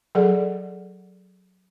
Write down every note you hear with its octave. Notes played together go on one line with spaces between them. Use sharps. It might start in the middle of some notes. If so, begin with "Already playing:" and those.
F#3 G#4 A4 D5 F#5